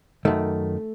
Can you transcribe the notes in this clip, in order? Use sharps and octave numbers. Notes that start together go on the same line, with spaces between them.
F#2 D#3 A3